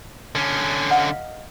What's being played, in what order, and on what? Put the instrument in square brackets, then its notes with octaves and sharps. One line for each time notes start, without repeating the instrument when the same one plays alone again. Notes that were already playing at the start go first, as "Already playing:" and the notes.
[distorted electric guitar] D3 C#4
[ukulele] D#5 F5 F#5